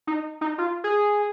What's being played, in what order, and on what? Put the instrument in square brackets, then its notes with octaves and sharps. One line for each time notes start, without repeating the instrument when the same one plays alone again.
[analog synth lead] D#4
D#4
F4
G#4